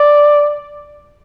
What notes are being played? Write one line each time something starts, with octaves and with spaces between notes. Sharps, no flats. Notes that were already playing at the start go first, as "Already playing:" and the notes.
Already playing: D5